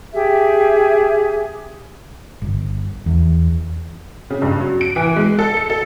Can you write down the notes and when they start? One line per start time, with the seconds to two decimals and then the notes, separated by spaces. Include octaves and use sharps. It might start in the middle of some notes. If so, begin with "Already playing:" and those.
0.13 G4 G#4 E5
2.42 G1
3.06 E2
4.30 C#3
4.42 G2
4.60 F#3
4.81 D7
4.96 E3
5.16 G#3
5.39 A4
5.57 C#7
5.70 A4